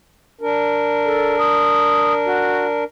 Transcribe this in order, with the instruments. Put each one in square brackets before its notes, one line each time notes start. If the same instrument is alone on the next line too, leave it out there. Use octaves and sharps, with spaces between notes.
[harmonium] D4 A#4
[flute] A4
D#6
F#4